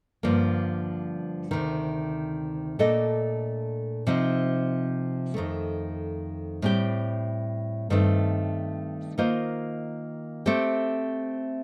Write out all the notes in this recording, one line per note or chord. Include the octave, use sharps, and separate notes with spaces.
G2 D3 F3 A#3
D2 C3 D#3
A#2 A3 D4 A4 D#5
C3 F3 C4 D#4
F2 D#3 A3
A2 G3 C4 G4
G2 D#3 A3 C4
D#3 A#3 F4 C5 D#5
A3 C4 G4